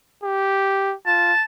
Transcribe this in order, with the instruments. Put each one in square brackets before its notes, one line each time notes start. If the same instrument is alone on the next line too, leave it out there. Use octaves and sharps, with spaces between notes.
[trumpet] G4
[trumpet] F4 [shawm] A5